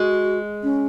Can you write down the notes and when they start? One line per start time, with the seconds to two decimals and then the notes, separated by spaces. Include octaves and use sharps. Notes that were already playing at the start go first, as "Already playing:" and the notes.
Already playing: G#3 F#4
0.63 C#4